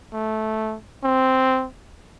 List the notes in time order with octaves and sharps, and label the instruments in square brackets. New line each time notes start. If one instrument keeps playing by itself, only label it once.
[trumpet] A3
C4